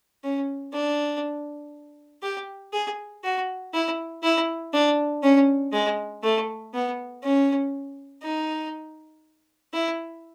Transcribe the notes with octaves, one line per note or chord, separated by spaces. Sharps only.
C#4
D4
G4
G#4
F#4
E4
E4
D4
C#4
G#3
A3
B3
C#4
D#4
E4